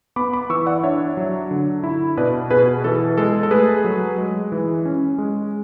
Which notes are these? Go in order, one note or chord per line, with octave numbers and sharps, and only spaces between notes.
B3 B5 D6
B5 D6
E3 C#6 E6
D5 F#5
D4 C#5 E5
F#3
D3
E4
B2 B4 D5
B2 G#4 B4
E3 A4
G#3 A4
A4
A3 G#4 B4
F#3
G#3
E3
C#4
G#3